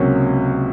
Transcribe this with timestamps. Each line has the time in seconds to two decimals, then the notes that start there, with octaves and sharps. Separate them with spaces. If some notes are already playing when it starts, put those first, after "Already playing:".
Already playing: C#2 C3 F#3 A#3 C#4